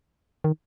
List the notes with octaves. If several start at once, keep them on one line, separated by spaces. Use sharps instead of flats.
D#3